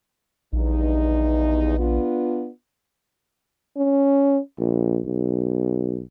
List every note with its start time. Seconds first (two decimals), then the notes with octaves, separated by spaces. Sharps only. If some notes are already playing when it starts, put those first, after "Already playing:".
0.53 A#1 E2 G2 D#4
1.78 B3 D4 F4
3.77 C#4
4.59 A#1
5.06 B1